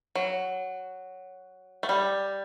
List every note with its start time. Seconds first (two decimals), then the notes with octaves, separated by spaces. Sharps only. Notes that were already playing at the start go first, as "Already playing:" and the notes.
0.15 F#3
1.83 A3
1.89 G3